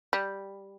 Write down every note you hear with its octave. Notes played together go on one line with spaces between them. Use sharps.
G3